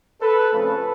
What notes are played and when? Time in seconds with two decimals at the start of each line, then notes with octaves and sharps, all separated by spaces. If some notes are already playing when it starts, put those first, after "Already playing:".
0.20 A4 B4
0.52 C#3 F3 A3 C4 A4 B4